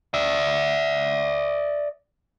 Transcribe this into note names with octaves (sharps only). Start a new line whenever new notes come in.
D5 E5